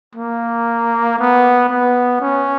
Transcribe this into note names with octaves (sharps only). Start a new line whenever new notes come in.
A#3
B3
B3
C#4